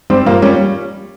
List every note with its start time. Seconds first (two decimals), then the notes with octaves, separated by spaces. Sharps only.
0.10 G3 C4
0.26 A#2 A#3
0.42 G3 C#4